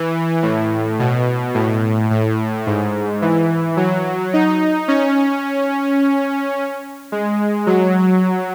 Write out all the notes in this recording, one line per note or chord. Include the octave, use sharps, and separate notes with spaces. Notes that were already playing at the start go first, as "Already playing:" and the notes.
Already playing: E3
A2
B2
A2
A2
G#2
E3
F#3
D#4
C#4
G#3
F#3